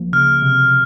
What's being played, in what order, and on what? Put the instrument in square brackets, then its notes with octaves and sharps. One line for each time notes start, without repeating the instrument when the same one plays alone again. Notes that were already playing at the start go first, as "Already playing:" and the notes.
Already playing: [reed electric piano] C#2 F3 A#3
[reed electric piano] C#3 [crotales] F6
[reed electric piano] C3